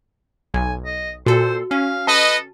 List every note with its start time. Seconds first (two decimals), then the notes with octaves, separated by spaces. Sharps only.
0.54 B1 G#5
0.85 D#5
1.26 A#2 F#4 A4 C5
1.71 C#4 F5
2.07 A4 B4 D#5 A5